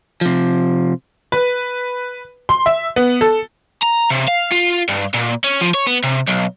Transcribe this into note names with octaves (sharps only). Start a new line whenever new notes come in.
C3 F3
B4
C6
E5
B3
A4
A#5
C3
F5
F4
G2
A#2
C#4
F3
C#5
B3
C3
B1